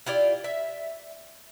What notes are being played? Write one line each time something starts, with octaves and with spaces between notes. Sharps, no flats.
E4 F4 G4 D5
E5